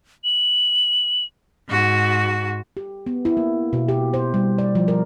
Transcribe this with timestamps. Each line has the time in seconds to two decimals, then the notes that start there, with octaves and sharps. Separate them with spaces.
0.24 F#7
1.69 G#2 F#4
2.77 G4
3.06 B3
3.25 E4
3.37 A#3
3.73 B2
3.88 G4
4.14 C5
4.34 G3
4.58 D5
4.75 F3
4.88 A#4